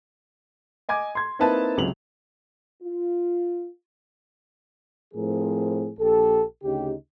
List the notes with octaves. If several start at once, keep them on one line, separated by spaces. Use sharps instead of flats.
D#5 G#5 D6 G#6
C6 G#6
A#3 C4 D#4 E4 B4 A5
C#2 C3 F#3 F7 F#7
F4
A2 F3 C4 G#4 A#4
A#1 G4 A4
D2 C#3 D#4 G4